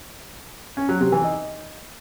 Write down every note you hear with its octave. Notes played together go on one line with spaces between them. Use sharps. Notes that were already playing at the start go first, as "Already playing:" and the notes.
C#4
F#3
C3
E3
D#4